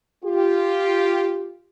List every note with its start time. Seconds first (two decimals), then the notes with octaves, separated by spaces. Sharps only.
0.25 F4 G4